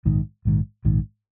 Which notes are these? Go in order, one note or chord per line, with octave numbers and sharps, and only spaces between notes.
A#1 G#2 D#3
A#1 G#2 D#3
A#1 G#2 D#3